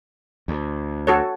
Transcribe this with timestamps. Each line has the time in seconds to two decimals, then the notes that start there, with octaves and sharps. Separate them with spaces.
0.48 D2
1.07 F#4 A4 C#5